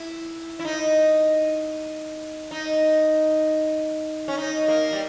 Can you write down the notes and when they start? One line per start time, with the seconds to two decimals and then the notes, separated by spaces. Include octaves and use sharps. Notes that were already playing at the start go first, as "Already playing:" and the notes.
Already playing: E4
0.59 E4
0.65 D#4
2.51 D#4
4.28 C#4
4.37 D#4
4.68 A#3
4.93 G3